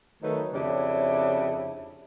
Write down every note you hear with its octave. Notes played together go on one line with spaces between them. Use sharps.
D#3 F#3 A3 D#4 B4
F2 C#3 D4 E4 G4 C#5